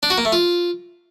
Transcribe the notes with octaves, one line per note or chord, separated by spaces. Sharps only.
D4
F#4
A#3
A3
F4